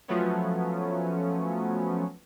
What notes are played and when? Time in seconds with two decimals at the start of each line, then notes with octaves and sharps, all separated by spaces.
0.08 F3 F#3 A3 B3 C#4